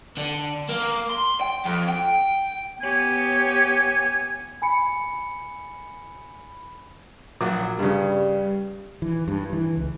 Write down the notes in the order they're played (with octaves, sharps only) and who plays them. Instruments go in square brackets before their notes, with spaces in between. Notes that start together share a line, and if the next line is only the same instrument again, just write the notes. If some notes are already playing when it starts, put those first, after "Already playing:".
[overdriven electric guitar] D3
A#3
C6
G5
F2
G5
[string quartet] B3 G4 C#5 [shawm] G#5
[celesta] G#5 B5 C#7
[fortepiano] A#1 F#3 D6
[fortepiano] G2 C#3 [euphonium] G3
[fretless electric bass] E3
G2
E3
C#2